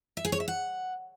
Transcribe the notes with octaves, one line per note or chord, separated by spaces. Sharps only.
E5
G#4
C#5
E5
F#5